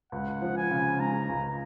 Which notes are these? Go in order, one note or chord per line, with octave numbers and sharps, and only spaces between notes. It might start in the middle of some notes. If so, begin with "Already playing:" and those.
C#2 F#5
F3
G#5
C#3
G#3 A#5
C#2